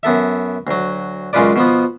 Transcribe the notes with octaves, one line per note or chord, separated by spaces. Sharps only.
F#2 B3 A4 E5
D2 F#3
F#2 C#3 G#3 F4 B4 D5
B2 F3 B3